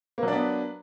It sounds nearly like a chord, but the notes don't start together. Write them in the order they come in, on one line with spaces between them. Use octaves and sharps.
A#3 F#3 D4 B3